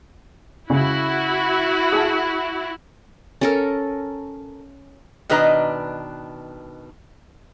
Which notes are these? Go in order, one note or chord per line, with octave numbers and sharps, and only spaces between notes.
C#3 E4 F#4
G#4 A5
C#4 A4 A#4
B2 D#3 D4 B4 D#5 A#5